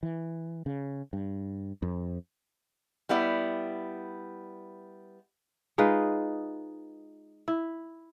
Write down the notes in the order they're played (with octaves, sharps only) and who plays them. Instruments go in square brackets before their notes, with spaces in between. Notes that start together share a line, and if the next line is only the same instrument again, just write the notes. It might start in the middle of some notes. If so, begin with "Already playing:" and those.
[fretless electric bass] E3
C#3
G2
F2
[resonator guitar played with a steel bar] G3 B3 E4 D5
[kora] G#3 D#4 F4 B4
E4